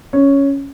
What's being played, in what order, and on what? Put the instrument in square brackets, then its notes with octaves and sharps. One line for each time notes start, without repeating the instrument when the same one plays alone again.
[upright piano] C#4